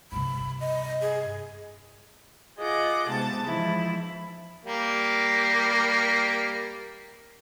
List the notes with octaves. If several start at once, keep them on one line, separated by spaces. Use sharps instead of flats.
G2 C3 B5
D#5
G#4
F4 G#4 D#5 F#5 D6
G#2 C3 B3 A5 A6
G#2 E3 F3 E4
G3 A#3